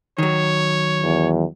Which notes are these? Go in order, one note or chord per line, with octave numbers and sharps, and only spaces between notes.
D#3 F#3 C#5
E2